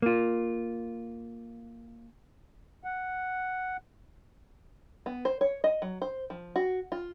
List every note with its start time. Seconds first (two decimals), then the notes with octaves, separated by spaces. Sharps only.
0.02 A#3 F4
2.84 F#5
5.06 B3
5.25 C5
5.41 C#5
5.64 D#5
5.82 F#3
6.02 C5
6.30 F3
6.56 F#4
6.92 F4